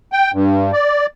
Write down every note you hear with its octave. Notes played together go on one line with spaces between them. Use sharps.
G5
G2
D5